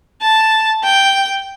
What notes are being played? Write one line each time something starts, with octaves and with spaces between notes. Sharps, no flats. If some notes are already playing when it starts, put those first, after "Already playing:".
A5
G5